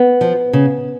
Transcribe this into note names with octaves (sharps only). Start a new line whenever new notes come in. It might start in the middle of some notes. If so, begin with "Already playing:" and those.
Already playing: B3
F3
C#3